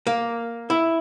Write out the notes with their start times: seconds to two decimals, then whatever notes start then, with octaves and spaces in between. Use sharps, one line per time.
0.07 A#3
0.70 E4